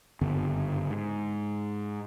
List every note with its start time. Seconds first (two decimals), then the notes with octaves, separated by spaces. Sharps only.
0.21 F#1 G2 D3 B3
0.90 G#2